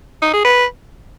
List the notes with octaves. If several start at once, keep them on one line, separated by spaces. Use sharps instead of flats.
D#4
G#4
B4